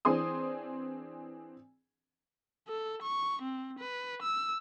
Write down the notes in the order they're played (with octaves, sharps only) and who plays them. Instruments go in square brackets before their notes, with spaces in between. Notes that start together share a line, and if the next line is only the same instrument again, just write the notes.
[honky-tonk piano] E3 C4 D4 G#4 C6 D#6
[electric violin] A4
C#6
C4
B4
E6